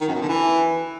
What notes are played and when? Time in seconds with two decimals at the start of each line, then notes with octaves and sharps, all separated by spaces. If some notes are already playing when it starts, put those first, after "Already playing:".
0.01 D#3
0.08 F#2
0.15 B2
0.22 D3
0.28 E3